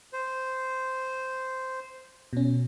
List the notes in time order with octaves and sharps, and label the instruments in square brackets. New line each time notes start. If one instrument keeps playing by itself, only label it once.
[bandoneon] C5
[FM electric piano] B2 C#4